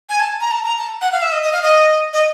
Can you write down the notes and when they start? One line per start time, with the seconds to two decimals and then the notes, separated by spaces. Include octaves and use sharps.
0.09 G#5
0.20 A5
0.40 A#5
0.51 A5
0.64 A#5
0.78 A5
1.01 F#5
1.12 F5
1.22 E5
1.32 D#5
1.43 D#5
1.53 F5
1.63 D#5
2.13 D#5